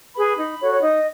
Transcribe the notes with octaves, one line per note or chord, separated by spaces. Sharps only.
G#4 B4 B5
D#4
F#4 A4 C#5
C#5
D#4 D#5